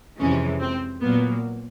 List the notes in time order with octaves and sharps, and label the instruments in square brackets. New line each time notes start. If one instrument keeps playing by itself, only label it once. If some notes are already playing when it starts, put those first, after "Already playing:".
[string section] F2 C3 E3 G#3 C#4
C4
A#2 F#3 A#3 B3